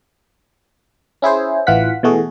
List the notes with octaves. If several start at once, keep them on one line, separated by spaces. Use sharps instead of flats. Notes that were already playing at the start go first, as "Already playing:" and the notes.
C#4 E4 G#4 C5
A1 E3 F4 F5 F#5 B6
B2 E3 A3 F#4 G#4